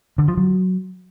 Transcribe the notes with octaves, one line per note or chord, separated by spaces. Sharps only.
D3
F3
F#3